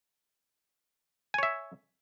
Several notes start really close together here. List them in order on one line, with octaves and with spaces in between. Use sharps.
G#5 C#5 E5